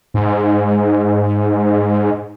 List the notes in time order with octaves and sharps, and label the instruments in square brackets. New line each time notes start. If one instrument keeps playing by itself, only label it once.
[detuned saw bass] G#2